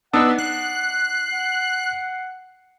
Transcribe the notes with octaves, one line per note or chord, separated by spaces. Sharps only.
B3 D4 D#4 F#5 E6
F#6 C7
F#5